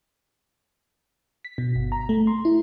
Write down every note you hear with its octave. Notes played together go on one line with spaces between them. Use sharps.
B6
B2
G1
A#5
A3
C6
E4